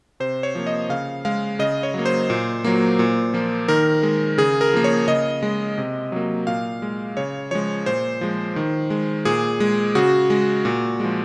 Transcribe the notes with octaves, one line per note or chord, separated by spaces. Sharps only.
C3 C5
C#5
F3 A#3
D#5
C#3 F5
G#3 F5
C#3 D#5
C#5
F#3 A#3
C5
A#2
F#3 A#3
A#2
F3 A#3
D#3 A#4
G#3
C#3 G#4
A#4
F3 A#3
C#5
C#3 D#5
G#3
C3
F#3 A#3
A#2 F5
G#3
C#3 C#5
F3 G#3 C#5
A#2 C5
F3 G#3
D#3
G#3
A#2 G#4
G#3
C#3 F#4
G#3
A#2
F3 G#3